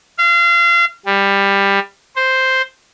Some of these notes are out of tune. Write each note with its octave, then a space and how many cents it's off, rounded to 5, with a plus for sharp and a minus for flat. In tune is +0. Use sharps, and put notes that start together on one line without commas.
F5 -30
G3 +15
C5 +0